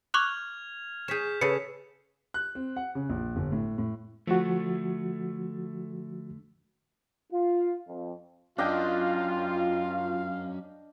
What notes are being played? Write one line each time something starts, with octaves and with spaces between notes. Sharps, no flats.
C#6 D6 F6 F#6 G#6 F7
G#4 C#5 G6 B6 E7
C#3 G#4 A4 B4 C#5 C#7
F#6
C4
F#5
C#3
A#1
G1
A2
A2
D3 F3 A3 F#4
F4
F2
F#3 C#4 D4 F4 D#5 F5 G5